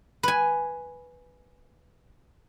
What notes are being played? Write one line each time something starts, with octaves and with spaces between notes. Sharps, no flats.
B4 G#5